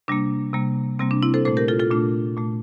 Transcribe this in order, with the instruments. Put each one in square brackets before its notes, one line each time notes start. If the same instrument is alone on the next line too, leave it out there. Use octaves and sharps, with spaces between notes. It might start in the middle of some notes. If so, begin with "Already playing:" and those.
[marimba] C3 G3 A#3 D4
C3 G3 A#3
C3 G3 A#3 C4
D4
C4 E4
A4 C5
A#2 A3 A4 C5
G4 A#4
F4 A4
F4 A4
A#2 A3 D4 F4
A#2 A3